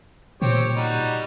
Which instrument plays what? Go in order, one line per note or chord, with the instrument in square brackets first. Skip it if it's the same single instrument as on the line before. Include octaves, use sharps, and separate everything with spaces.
[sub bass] A#2 [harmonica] C4 G4 C#5
[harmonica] G3 D#4 F#4